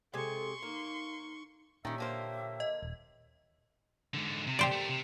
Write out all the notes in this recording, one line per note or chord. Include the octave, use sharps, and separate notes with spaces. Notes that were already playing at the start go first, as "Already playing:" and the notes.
C3 G#3 A4 G#5 C6 C#6
A#3 D#4
A#2 D#3 C#4 G4 C#5 E5
D3 A#3 C5
D#5
D#1
G#2 D3
C3
G4 C5 D5
A3 A#4
C3